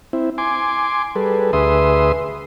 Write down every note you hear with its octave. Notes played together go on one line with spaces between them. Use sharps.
C4 E4
G#5 C6 D6
G3 G#4 A4 B4
D2 G#4 B4 E5 C6 D#6